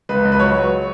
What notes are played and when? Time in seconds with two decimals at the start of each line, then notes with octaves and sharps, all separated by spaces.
0.09 C#2 B4
0.25 C#2
0.32 B4
0.39 F#3 C#5